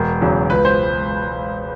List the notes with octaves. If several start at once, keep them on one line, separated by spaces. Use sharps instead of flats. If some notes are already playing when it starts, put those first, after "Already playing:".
Already playing: E1 A#4
E2 C#3 F#3
C#2 B4
C5